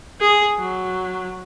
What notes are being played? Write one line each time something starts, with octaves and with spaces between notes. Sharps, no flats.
G#4
F#3